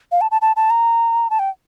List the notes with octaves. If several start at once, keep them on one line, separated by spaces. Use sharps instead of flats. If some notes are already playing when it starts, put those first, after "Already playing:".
F5
A5
A5
A5
A5
A#5
A5
G5